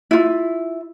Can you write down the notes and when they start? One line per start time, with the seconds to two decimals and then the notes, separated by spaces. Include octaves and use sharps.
0.11 E4 F4